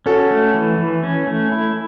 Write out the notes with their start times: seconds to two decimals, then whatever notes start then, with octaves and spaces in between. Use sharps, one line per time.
0.06 C#4 F#4 A4
0.31 A3
0.54 E3
0.78 E3
1.03 C#4
1.27 A3
1.52 E4